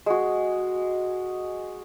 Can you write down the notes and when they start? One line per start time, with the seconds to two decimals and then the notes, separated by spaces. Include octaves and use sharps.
0.06 G#3 F#4